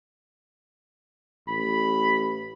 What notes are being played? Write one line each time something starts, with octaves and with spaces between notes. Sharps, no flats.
A1 B5